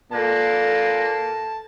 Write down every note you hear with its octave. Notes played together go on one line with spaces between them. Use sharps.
A#2 A#3 A4 B4 A5